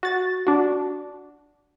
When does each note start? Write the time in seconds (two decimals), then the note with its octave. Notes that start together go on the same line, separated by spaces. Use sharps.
0.03 F#4 A6
0.47 D4 F#4